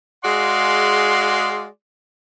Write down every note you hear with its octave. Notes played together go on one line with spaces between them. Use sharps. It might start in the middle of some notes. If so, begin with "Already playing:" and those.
G#3 F#4 G#4 D5 F5 C6